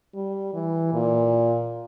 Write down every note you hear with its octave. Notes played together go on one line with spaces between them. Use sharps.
G3
E3
A#2